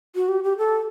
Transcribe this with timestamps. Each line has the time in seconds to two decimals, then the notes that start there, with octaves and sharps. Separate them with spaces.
0.15 F#4
0.28 G4
0.44 G4
0.58 A4